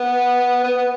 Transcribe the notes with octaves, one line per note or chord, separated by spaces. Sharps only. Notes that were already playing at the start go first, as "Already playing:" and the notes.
Already playing: B3
B3
B3